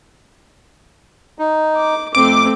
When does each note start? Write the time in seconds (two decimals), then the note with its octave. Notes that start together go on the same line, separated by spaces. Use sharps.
1.39 D#4
1.76 D6
2.15 F2 A3 C4 D6